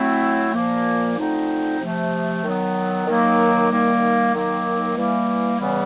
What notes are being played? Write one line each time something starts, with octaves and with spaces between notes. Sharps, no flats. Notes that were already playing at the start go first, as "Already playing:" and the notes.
Already playing: F#3 A3 C4 E4
A#2 F3 A#3
D3 F3 A3 C4 D#4
C3 F3 A3
D#3 F#3 B3
D#3 F#3 A#3
D#3 G3 A#3
D#3 F#3 A#3
E3 G3 A#3
C#3 E3 G3 B3